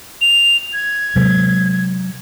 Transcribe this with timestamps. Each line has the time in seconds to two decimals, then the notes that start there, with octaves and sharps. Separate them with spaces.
0.21 F7
0.73 G#6
1.16 C3 F#3 G#3